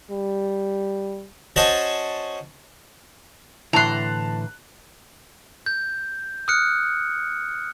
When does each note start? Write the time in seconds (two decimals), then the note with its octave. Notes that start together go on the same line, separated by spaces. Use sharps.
0.11 G3
1.56 C#4 F#4 C5 C#5 D#5 A5
3.73 A2 D3 E3 A5 A#5 C6 F#6
5.66 G6
6.48 D#6 F6 F#6 C#7